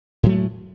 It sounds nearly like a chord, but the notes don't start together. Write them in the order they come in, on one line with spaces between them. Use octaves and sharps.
A2 F#3 A3 G#3